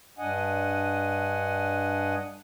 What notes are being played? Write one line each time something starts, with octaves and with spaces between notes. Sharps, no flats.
G2 D4 D#5 F#5 G#5